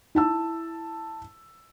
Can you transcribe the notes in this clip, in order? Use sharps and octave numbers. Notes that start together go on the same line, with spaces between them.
E4 A5 E6